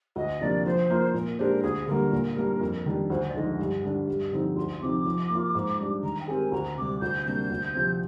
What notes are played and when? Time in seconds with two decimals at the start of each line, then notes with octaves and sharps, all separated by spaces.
0.16 D2 D#5
0.41 C3 F3 A#3 D4 D5
0.65 F3 C5
0.90 A#3 F4
1.14 A#2 A#4
1.38 G#3 D4 G4 A#4 C5
1.63 D2 G#4
1.87 D3 G3 A#3 A#4
2.12 A#2
2.36 G3 A#3 D4
2.61 F2
2.86 D#3 G3 D4
3.10 D2 C5
3.29 D5
3.34 D3 F3 G#3 D#4 D#5
3.59 G2
3.83 D3 G3 D4
4.08 G2
4.32 D3 F3 C4 D#4
4.56 D2 C6
4.82 C3 F3 C4 D#4 D6
5.06 F3
5.30 A#3 F4
5.55 G#2
5.80 G3 D4
6.03 D#3 A#5
6.20 G5
6.28 G#3 C4 G4 A#4 G#5
6.52 D2 A#5
6.77 C3 G3 D6
7.01 D2 G6
7.26 C3 G3 A#3 D4 G6
7.50 D2
7.74 C3 F3 C4